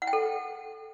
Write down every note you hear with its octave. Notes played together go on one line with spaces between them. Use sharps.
F#5
G5
A4